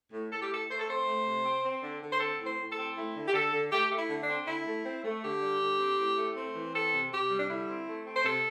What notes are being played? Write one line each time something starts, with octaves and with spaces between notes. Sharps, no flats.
A2
A2 A4
G4
A3 A4
A3 C5
A4
C4 C5
A3
C3
C4
C4
D3
D3
C5
C4 A4
A2
C5
A2
A4
C4
A3 E4
D3
G4
D3 A4
D3
A3 G4
A3
E4
D3
D4
C4
D3 E4
A3
C4
A3
D3 G4
G3
D3
C4
A2
A3
C4
E3
C4 A4
C3
C3 G4
G3
D4
D3 E4
C4
A3
C4
C5
C3 A4